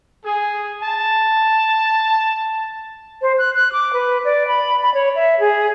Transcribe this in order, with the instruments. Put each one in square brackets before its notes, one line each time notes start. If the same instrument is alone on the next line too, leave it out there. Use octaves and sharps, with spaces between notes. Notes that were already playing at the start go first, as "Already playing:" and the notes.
[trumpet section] G#4
A5
[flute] C5
F#6
F#6
D6
B4
D5
B5
B5
C#5
E5
G#4